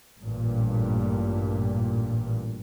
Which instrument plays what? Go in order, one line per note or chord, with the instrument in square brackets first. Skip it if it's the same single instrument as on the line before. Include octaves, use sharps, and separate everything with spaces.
[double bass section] A1 G2 A#2